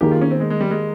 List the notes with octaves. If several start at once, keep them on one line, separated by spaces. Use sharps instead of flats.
D#3 A#3 D#4 G4 G#4
F4
C#4
C4
G#3
G#3
G3
G#3